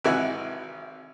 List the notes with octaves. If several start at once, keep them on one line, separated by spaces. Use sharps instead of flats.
G#1 C3 E3 G#3 F#4 G#5